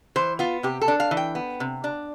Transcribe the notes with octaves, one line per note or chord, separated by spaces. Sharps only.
E3 C5
B3 F4
C3 G4
A4
D4
F5
E3
G5
B3
C3
D4